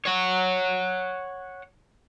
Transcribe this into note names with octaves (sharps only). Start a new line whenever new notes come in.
C#5 F#5